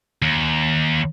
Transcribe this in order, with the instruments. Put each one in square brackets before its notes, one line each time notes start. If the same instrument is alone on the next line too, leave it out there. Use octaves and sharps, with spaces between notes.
[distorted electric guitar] D#2